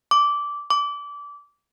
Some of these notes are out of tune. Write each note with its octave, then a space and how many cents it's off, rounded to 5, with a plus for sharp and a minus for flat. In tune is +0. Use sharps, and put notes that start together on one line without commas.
D6 -15
D6 -25